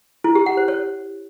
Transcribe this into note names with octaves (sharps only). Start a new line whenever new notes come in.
E4
G4
F#5
C5
C#5